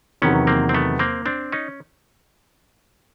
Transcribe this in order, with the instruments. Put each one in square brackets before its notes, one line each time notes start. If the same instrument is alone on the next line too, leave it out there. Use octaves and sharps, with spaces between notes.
[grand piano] E2 C3 D#3 F#3 [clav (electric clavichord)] B3 C#4
[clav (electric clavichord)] A#3 C4
C4
A3 B3
A#3 C4
C4 D4
C#4 D#4